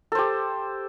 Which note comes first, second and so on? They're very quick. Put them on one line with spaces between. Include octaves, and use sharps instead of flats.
A4 C5 G4